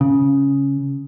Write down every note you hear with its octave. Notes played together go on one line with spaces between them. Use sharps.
C#3